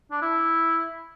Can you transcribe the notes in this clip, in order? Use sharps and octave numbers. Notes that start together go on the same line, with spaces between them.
D4
E4